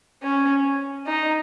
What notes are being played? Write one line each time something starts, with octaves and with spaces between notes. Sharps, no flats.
C#4
D#4